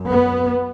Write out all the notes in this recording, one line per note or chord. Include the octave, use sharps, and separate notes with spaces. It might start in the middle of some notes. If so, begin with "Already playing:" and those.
Already playing: F#2
B3